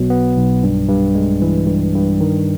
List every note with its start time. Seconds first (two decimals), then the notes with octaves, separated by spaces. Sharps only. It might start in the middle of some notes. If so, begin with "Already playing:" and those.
Already playing: B1 B2 F#3 B3
0.10 B3
0.37 B1
0.63 G2
0.89 G2
1.15 G#3
1.42 E3
1.68 G2
1.94 G2
2.20 D#3